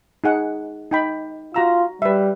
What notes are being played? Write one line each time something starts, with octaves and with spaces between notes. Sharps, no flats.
D#4 G#4 F#5
D#4 G5 B5
F4 F#4 A#5 E6
G3 B4 E5